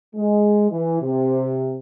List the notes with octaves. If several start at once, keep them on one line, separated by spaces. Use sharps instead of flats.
G#3
E3
C3